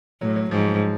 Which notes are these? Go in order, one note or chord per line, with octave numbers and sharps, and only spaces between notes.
A2 F#3
F#3
G#2 F3